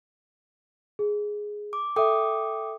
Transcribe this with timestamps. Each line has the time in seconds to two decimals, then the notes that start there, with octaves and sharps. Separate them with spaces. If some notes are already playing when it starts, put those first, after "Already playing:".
0.99 G#4
1.73 D6
1.96 A4 E5 G5 D6 D#6